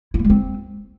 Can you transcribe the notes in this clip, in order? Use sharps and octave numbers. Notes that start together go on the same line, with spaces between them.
E4
A#3
G#3
C4